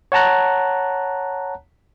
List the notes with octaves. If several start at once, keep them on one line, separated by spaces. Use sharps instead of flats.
C#5 F#5 A5 A#5 F#6